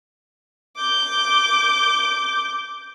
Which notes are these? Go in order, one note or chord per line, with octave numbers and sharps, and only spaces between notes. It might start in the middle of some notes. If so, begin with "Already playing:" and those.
D6 G6